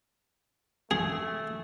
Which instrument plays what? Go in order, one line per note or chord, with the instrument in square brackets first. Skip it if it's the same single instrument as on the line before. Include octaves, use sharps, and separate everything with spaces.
[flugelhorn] A3 [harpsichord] G#4